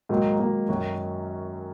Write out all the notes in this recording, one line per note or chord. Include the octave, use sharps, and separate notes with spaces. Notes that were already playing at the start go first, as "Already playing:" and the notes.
G#2 D#3 F#3 A#3
G#2 D#3 F#3 A#3
F#2 D#3 F#3 C#4 F#4